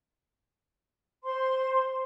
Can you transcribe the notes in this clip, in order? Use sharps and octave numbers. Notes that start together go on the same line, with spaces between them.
C5 C6